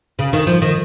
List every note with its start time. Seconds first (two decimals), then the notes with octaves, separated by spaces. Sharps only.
0.19 C#3
0.33 D#3
0.47 F3
0.62 D#3